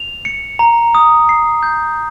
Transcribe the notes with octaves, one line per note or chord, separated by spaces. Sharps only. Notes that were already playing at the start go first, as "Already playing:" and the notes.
Already playing: F7
C#7
A#5
D#6
C7
G6